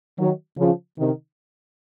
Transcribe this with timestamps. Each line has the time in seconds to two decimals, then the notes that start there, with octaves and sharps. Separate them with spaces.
0.18 D#3 F#3
0.58 C#3 F3
0.97 C3 D#3